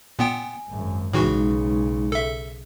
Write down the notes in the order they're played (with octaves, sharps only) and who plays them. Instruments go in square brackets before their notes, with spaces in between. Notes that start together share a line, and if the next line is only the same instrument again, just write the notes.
[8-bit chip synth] A#2 B3 G5 [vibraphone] G#5
[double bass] G#1 F#2
[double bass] B1 C#3 [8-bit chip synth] A2 E3 F#4 [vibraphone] G#3 D#4
[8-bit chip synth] A4 E5